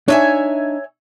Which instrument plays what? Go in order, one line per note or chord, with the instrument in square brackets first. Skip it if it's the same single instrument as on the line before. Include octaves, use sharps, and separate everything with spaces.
[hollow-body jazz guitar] D4 D#4 [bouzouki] C#5 E5 G#5